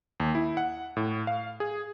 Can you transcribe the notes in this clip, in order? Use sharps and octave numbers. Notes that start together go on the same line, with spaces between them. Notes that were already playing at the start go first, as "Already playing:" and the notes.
D#2
E4
F#5
A2
F5
G#4